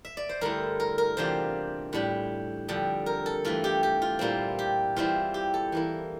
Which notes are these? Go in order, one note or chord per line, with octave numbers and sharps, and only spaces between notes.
E5
D5
C5
G2 D3 A3 E4 A#4
A#4
A#4
E2 C3 G3 D4 F4 C5
A2 G3 D4
F2 D3 G3
A#4
A4
G2 E3 A3 F4
G4
G4
F4
A#2 G3 C4 E4 F4
G4
E2 E3 G3 C4 E4 F4
G4
A4
E3 A#3 E4